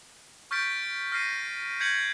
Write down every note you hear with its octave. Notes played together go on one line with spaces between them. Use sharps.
C#6 F6 G6 A6 B6 D7
F6 A#6 C7 D#7
G6 G#6 B6 C#7 F#7